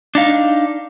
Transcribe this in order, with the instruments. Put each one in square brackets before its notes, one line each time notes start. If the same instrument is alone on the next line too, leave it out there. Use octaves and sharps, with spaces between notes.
[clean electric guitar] D4 D#4 F5